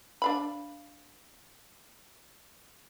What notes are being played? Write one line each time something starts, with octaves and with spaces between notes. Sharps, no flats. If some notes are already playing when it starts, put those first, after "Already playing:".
D4 F5 B5